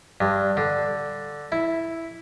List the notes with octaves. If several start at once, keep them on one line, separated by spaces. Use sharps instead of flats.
G2
D3
E4